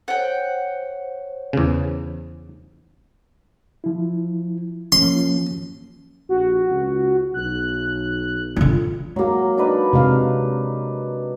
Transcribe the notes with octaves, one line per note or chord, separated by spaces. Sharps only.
C5 C#5 F#5 G5
E2 C#3
F3 E4
F3 A#3 C#4 C6
A#1 F#4
C#2
B1 F#6
D3 F4
F#3 G#3 A#3 F#4
D4 D#4 B4
C3 G#3 F5